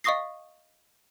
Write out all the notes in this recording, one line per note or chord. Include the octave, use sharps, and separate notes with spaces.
D#5 F5 C#6 D#6 A#6 C7